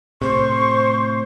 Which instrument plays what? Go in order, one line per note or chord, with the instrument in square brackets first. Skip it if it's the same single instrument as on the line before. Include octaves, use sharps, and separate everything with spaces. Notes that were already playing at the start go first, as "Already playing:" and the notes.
[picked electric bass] A2 C3 [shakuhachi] C5 [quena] C#6